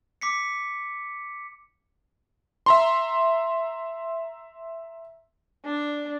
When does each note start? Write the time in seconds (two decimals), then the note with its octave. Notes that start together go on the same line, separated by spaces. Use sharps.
0.21 D6 B6 C#7
2.66 E5 A#5 C6
5.65 D4